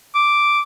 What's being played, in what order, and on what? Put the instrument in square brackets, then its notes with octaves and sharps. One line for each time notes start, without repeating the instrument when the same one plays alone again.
[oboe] D6